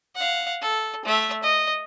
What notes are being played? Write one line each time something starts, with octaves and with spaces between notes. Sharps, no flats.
F5 F#5
A4
A3 E5
D#5